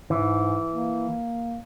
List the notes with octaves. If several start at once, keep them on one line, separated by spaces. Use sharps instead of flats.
G#2 E3
A#3